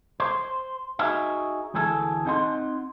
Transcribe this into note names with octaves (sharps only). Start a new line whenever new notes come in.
C5
D#4 F#4 G#4 E5
D2 E3 A3 G#4 A4
C4 D#4 D#5 F#5 A5 C6